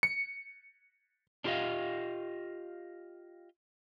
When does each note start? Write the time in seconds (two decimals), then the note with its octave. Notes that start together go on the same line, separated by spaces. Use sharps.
0.03 C#7
1.44 D4 F4 G4 A#4 D#5 F5